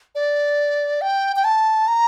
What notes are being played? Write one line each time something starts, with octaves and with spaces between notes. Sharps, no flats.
D5
G5
G5
A5
A#5